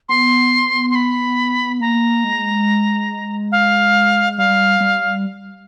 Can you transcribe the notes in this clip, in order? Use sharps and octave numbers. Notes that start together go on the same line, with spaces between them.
B3 C6
C6
B5
A#3 A#5
G#3
F5
G3 F5
G3